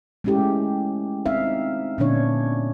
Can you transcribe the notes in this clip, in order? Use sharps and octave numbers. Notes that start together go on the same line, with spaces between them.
G#3 A3 C#4 E4 G4 A4
C4 D#4 E5 F5
A#2 D3 B3 C#4 D4 C#5